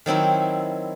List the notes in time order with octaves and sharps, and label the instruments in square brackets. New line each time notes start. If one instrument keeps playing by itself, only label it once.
[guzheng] D#3 F#3 C4 E4